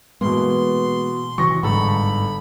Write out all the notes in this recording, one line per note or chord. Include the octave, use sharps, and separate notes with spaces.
B2 E3 G#3 A#3 C6
C3 E3 F#3 C#6 A#6
G1 G#2 A4 A#5 B5